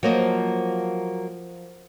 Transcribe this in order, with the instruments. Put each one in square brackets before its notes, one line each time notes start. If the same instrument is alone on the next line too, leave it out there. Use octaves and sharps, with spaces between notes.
[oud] F3 [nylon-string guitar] F#3 A#3 D#5